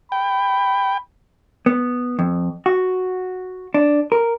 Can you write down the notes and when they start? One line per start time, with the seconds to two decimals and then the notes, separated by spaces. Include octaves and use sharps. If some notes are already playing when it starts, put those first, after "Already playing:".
0.12 G5 B5
1.66 B3
2.19 F2
2.66 F#4
3.74 D4
4.12 A#4